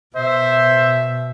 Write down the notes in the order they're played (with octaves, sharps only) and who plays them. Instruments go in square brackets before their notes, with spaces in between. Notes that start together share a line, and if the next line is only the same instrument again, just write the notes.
[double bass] B2 [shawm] C5 [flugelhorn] E5